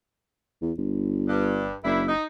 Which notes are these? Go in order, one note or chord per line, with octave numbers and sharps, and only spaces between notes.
E2
G1
G2
F#1 D#3 D4 E4
D#4